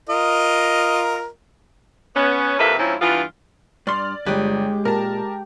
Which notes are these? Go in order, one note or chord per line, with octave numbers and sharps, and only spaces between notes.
F4 A#4 D#5
B3 C#4
F2 C3 A#3 A4 B4 E5
G#2 F3 C4 C#4 E4
G2 E3 B3 F4
G2 D5 C6 F6
G1 G#3 G4 B4 D5
A#2 A#4 A5